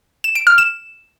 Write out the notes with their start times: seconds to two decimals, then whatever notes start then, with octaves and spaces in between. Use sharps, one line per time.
0.24 E7
0.35 D7
0.47 F6
0.58 E7